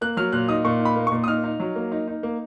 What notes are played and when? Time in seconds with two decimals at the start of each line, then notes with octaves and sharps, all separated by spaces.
0.01 A#3 F#6
0.17 F#3 F6
0.32 A#2 F#6
0.49 D#4 D#6
0.65 A#2 C#6
0.80 D#4
0.85 B5
0.96 A#3
1.07 C#6
1.12 A#2
1.24 D#6
1.28 D#4 F6
1.44 D#4
1.60 F#3
1.76 A#3
1.92 D#4
2.08 D#4
2.23 A#3